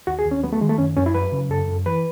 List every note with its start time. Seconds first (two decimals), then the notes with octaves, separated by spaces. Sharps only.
0.07 D#2 F#4
0.19 G#4
0.26 D#2
0.31 C#4
0.43 F#3 B3
0.53 A3
0.61 D#3 G#3
0.69 A3
0.78 F#2 C#4
0.97 F#2 C#4
1.06 E4
1.14 F#3 B4
1.32 C#3
1.50 F#2 A4
1.68 F#2
1.86 E3 B4